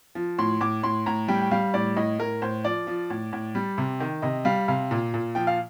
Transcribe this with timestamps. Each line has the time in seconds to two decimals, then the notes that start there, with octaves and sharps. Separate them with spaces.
0.15 F3
0.39 A2 C6
0.61 A2 D6
0.83 A2 C6
1.06 A2 A#5
1.28 G3 G5
1.41 G5
1.51 G3 F5
1.74 A2 D5
1.97 A2 D#5
2.19 A2 A#4
2.42 A2 C5
2.64 F3 D5
2.87 F3
3.10 A2
3.33 A2
3.55 G3
3.78 C3
4.00 D#3
4.22 C3 D#5
4.45 G3 F5
4.68 C3 F5
4.91 A#2
5.14 A#2
5.35 F3 G5
5.47 F5